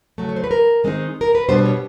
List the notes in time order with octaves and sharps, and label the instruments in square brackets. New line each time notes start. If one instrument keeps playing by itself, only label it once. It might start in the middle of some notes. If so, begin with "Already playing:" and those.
[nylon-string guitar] C#3 F#3 A3
C#5
C5
B4
A#4
D#3 G#3 C4 D#4
A#4
B4
B2 G3 B3 D4 C5
C#5